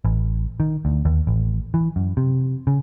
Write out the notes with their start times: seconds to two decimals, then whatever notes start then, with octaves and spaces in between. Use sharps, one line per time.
0.05 A1
0.60 D#3
0.85 D2
1.05 D#2
1.27 A1
1.74 E3
1.96 F#2
2.17 C3
2.67 C#3